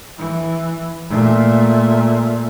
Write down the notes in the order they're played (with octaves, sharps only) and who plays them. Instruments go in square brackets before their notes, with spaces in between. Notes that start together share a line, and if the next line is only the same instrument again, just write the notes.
[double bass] E3
A#2 A3